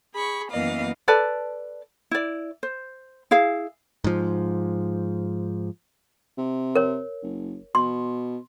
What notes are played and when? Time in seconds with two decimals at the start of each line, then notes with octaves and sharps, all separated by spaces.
0.14 G#4 B5 C#6
0.50 F#2 E3 A#3 B3 D#5 F5
1.08 A4 B4 D5 A5
2.11 E4 D5
2.63 C5
3.31 E4 G#4 F5
4.04 G#2 F3
6.37 C3
6.76 A#4 C#5
7.23 F#1
7.75 B2 C6